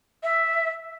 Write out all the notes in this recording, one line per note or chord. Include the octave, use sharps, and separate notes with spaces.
E5